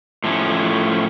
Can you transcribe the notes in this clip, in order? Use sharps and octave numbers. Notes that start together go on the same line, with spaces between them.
A2 F3 C#4